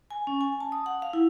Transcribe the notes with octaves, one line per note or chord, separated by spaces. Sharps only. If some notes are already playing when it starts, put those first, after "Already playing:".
G#5
C#4
G#5
A5
D#6
F#5
F5
E4